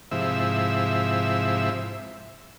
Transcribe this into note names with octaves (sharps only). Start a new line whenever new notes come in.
G#2 C3 F3 E4 E5